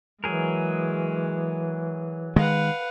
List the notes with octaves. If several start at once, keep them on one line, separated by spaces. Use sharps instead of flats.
E3 F#3 G#3 G#4 A#4
D#3 G#3 B4 F5 F#5